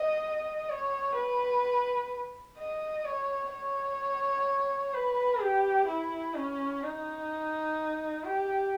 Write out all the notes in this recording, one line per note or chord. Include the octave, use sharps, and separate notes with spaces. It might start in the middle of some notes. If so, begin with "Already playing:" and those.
Already playing: D#5
C#5
B4
D#5
C#5
C#5
B4
G4
E4
C#4
D#4
G4